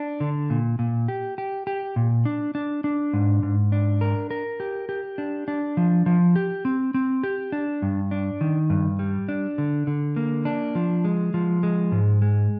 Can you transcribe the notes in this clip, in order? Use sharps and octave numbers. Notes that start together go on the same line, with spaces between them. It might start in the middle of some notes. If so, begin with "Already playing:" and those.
Already playing: D4
D3
A#2
A#2
G4
G4
G4
A#2
D4
D4
D4
G#2
G#2
D4
A#4
A#4
G4
G4
D4
D4
F3
F3
G4
C4
C4
G4
D4
G2
D4
D#3
G2
G3
D4
D3
D3
A#3
D4
F3
G#3
F3
G#3
G#2
G#3